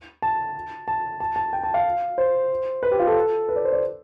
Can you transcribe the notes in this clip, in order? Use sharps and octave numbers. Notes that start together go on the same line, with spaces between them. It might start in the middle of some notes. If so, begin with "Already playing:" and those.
A5
A5
A5
A5
G5
A5
F5
C5
B4
G4
F4
A4
B4
D5
C5
D5